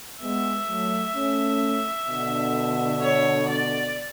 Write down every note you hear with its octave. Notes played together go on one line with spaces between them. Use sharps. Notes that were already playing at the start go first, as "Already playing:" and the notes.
G#3 B3 E5
F#3 A3
A3 C#4
B2 D3
C#5
D5